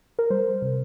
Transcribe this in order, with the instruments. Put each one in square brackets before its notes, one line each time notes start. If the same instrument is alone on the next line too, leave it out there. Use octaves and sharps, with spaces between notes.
[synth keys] A#4
G3 C5
C3